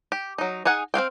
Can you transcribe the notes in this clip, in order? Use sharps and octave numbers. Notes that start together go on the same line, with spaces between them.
G4
F#3 D#4
D#4 G#4 F#5 G#5
C4 F#4 F5 G5